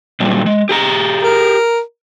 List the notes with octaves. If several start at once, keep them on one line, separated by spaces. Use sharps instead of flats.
A#2 F#3 G3
G#3
G4 G#4 A#5
A#4